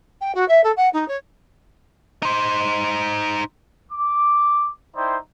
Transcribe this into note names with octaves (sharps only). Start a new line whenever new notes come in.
G5
F#4
E5
A4
F#5
D#4
C#5
D#4 C5
D6
D#4 E4 C5 D5 G5 C6